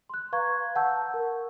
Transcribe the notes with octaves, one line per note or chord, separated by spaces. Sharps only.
C6 F#6
B4 F5 A#5 C#6 G#6
F#5 A5 C#6 E6 G6
A#4